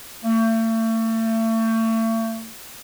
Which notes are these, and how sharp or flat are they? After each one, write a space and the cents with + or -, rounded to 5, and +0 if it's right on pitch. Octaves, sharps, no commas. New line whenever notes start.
A3 +35